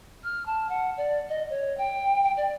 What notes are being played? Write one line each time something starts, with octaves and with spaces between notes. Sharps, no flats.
F6
A5
F#5
D5
D#5
C#5
G5
G5
D5